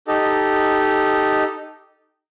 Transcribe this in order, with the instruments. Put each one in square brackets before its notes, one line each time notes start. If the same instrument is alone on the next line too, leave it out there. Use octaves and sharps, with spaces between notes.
[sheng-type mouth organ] D#4 G4 A4 D#5